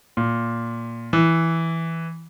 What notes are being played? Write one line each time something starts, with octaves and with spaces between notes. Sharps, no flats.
A#2
E3